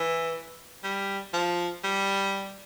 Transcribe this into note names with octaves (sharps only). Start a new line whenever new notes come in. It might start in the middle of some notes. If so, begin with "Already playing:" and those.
Already playing: E3
G3
F3
G3